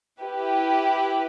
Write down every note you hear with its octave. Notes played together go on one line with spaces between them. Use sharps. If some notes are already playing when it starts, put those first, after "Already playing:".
E4 G4 B4